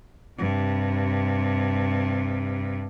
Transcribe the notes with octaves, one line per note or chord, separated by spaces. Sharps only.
G2 C3